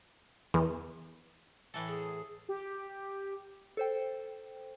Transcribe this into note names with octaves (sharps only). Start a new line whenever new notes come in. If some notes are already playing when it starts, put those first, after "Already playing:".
E2
A2 E3 A4
G#4
G4
A4 C5 G5